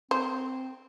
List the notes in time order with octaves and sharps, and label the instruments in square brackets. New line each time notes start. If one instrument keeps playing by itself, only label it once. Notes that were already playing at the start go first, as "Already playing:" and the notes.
[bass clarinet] C4 [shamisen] C5